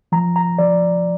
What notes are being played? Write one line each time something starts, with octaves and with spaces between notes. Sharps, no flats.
F3 A#5
A#5
F3 D5